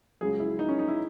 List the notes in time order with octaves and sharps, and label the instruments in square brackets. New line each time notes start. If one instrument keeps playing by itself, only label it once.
[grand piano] C#2 C#3 F#3 G#4
E4
D#4
C#4
D#4
E4